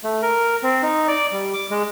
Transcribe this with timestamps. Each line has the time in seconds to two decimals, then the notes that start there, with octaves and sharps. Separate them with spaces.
0.04 A3
0.22 A#4
0.63 C4
0.83 D#4
1.08 D5
1.32 G3
1.54 D6
1.71 G#3